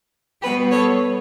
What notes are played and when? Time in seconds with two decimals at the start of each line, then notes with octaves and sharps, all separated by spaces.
0.42 B2 G3 B3 G4 B4
0.71 A4 C#5